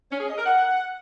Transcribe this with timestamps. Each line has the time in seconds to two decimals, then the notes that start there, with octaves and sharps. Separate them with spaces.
0.11 C#4
0.19 G#4
0.28 D#5
0.37 A#4
0.46 F#5